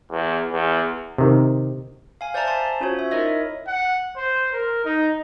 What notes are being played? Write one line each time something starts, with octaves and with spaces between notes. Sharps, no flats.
E2
E2
C3 D#3
F5 G#5
C5 D5 E5 A5 A#5
C5 G#5 A5 C6
C#4 F4 F#4 C5 C#5
E5
D#4 E4 A#4 C#5 D#5 E5
F#5
C5
A#4
D#4